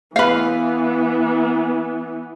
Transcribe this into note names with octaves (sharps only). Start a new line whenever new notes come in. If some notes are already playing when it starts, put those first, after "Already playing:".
E3 B3 B4 F5